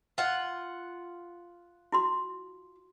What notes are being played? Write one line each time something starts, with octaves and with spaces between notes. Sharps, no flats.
F4 F#5
E4 F#4 C6